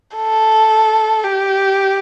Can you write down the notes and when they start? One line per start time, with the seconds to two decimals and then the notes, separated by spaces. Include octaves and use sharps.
0.16 A4
1.24 G4